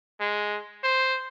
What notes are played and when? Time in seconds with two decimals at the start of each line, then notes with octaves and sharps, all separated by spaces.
0.20 G#3
0.84 C5